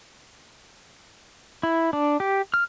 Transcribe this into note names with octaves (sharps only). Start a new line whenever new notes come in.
E4
D4
G4
F6